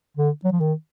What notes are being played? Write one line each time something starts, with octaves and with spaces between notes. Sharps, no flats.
D3
F#3
F3
D#3